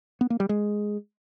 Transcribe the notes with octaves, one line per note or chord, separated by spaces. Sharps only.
B3
A#3
G3
G#3